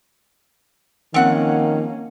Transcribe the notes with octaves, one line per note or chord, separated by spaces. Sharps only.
D#3 F3 A#3 C4 C#4 F#5